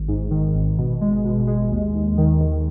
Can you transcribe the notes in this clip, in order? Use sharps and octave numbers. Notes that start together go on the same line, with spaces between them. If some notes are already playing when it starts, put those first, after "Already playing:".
Already playing: G#1
G#2
D#3
G#1
B2
G#3
B2
G#3
D#2
D#2
D#3
D#3